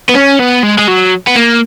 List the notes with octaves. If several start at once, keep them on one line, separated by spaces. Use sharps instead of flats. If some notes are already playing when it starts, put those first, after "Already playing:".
B3
C#4
B3
G#3
G#3
F#3
B3
A#3